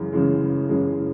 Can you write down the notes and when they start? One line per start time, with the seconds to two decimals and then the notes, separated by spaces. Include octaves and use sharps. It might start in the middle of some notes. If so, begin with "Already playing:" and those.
Already playing: F#2 C#3 E3 G#3
0.13 F#2 C#3 E3 G#3
0.69 F#2 C#3 E3 G#3